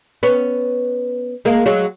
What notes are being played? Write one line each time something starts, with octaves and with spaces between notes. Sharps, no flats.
B3 C#4
G#3 A#3
F#3 G#3